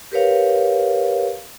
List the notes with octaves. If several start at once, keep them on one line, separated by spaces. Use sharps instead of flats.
G4 A#4 B4 C#5 F5